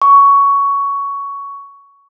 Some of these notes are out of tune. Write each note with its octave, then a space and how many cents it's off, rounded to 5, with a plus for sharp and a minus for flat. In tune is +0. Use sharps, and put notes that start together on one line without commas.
C#6 +15